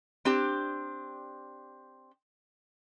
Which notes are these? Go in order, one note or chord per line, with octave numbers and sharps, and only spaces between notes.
C4 D4 G4